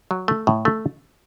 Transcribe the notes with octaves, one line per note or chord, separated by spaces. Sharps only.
F#3
A3
A2
A3